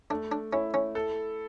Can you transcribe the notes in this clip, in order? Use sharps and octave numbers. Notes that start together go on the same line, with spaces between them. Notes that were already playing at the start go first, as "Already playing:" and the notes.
A3 D4
D4
C#4 E4
C#4
A4